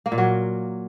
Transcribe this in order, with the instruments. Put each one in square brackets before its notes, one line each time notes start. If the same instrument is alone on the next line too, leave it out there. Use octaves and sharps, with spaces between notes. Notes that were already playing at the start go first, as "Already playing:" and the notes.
[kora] A#3
A#2
F#3